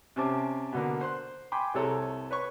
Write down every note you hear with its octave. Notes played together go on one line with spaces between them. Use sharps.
C3 C#4 C5 A5 D6
B2 D3 A#3
C5 C6 F#6
G5 G#5 B5 C6 D6
C2 C3 G#4 A4 C#5 A#5
B4 C#5 C#6